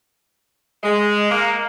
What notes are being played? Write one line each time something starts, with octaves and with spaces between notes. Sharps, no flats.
G#3
A#3